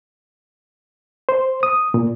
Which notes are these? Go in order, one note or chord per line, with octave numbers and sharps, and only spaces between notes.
C5
D#6
A#2